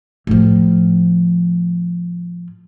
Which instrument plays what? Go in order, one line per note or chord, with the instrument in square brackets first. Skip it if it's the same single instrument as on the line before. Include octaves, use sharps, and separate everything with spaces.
[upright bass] A2 F3